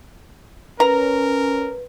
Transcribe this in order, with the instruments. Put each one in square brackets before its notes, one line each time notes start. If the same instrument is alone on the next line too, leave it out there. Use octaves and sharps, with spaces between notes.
[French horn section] C#4 [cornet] A#4 [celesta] B4 [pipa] A#5